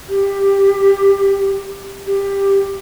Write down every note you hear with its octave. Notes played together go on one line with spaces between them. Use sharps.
G4
G4